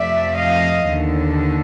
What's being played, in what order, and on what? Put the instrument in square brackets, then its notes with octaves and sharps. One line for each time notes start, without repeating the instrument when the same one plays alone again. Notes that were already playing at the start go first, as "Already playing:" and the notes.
Already playing: [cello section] F2 C3 F3 A3 D5 E5
D#5 F5
D#2 D3